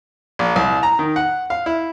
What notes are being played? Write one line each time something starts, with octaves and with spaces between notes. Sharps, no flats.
A#1
C2
A#5
D#3
F#5
F5
E4